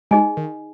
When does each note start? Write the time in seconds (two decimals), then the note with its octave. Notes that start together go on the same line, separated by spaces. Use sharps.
0.11 G#3 D#4 G#4 D#5 G#5
0.37 D#3